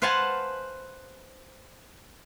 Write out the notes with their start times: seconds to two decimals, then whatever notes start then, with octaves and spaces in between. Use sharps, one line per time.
0.02 B4 C5 F5 F#5 G#5 A5